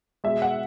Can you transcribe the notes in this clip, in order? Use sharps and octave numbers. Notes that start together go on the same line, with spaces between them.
B2 G#3 E5
F#5